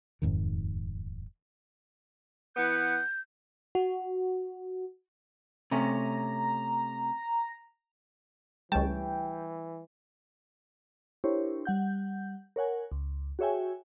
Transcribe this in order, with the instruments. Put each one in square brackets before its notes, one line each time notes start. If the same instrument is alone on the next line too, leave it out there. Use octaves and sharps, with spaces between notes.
[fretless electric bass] D#1 F2 G#2 D#3
[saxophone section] E3 B3 F#5 [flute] G6
[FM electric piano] F#4
[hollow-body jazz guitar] C3 A3 C#4 [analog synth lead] A#5
[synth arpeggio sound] C#2 A5 [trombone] E3 [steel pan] G3 A3 C#5 [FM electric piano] G5
[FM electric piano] D4 E4 G4 A#4 C5 C#5
G3 F#5 G6
A#4 C#5 F#5 G#5
C#2
F#4 G#4 C#5 E5 G5 G#5